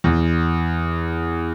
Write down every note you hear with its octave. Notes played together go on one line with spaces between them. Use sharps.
E2